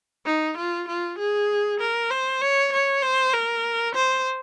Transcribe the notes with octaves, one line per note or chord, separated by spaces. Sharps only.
D#4
F4
F4
G#4
A#4
C5
C#5
C#5
C5
A#4
C5